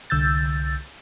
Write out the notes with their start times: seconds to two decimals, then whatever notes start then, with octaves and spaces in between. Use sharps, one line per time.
0.10 C2 D3 E6 G6 A6